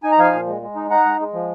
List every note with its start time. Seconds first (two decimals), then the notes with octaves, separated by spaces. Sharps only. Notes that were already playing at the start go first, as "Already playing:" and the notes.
0.03 D#4 G#5
0.12 A#5
0.18 F3 F5 G#5
0.33 A#2
0.46 G#3
0.62 G#3
0.76 D#4
0.90 D#4 F#5 A#5
1.05 G#3
1.20 G#3
1.33 F3